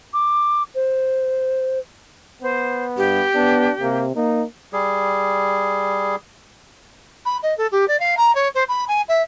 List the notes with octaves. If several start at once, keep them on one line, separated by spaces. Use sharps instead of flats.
D6
C5
B3 C5
G2 G4
B3 D4
C3 A#3
A#3 D#4
G3 G#4
B5
D#5
A4
G4
D5
F5
A#5
C#5
C5
B5
G#5
E5